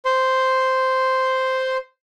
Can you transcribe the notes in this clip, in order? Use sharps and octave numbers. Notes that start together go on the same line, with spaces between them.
C5 C6